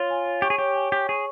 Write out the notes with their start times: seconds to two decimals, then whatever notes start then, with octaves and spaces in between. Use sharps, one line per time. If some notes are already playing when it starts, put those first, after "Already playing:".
Already playing: F4 C#5
0.10 G#5
0.26 C#5
0.42 G4 C#6
0.50 G#4
0.58 G4 C#5
0.75 G#5
0.92 G4 C#5
1.09 G#4 C#6